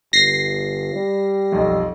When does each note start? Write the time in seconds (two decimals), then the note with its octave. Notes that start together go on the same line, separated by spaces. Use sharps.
0.13 G1 A#6 C7
0.95 G3
1.52 B1 F2